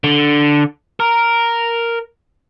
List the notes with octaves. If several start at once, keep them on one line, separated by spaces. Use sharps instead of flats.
D3
A#4